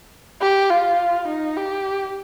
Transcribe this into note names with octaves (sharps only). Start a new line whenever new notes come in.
G4
F4
D#4
G4